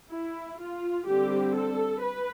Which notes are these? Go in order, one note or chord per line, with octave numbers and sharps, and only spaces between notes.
E4
F4
D3 G3 C4 G4
A4
B4